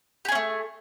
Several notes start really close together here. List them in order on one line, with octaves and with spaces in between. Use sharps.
G4 G#4 C#4 A3